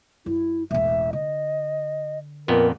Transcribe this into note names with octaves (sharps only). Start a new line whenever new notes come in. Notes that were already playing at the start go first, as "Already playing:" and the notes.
F#2 E4
E1 A1 E5
D3 D#5
F2 A#2 B3 A#4